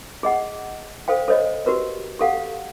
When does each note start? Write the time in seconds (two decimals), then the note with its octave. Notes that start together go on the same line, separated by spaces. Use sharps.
0.23 G#4 D#5 F#5
1.08 A4 C5 F5 G5
1.28 A4 C5 C#5 D#5
1.66 F#4 G4 A#4 B4
2.20 G4 A4 F5 F#5